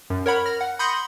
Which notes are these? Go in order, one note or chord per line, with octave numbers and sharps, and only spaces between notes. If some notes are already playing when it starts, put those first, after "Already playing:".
F#2
A#4 C#5 F#5 B5
F6 A#6
F#5
B5 C6 D#6 G6 A#6 C#7